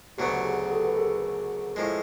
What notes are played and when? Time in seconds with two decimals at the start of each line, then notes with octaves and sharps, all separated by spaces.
0.18 D2 C#3 F#3 B3 G4
0.44 G#4
0.70 G4 A4
0.85 B4
0.97 G#4 A#4
1.76 A2 F3 G#3